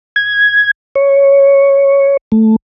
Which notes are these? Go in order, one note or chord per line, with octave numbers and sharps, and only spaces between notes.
G#6
C#5
A3